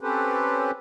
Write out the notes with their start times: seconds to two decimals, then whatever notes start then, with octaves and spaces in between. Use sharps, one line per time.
0.01 C4 C#4 G4 A4 B4 C5